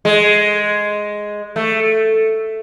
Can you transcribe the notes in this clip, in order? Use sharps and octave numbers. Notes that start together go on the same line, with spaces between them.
G#3
A3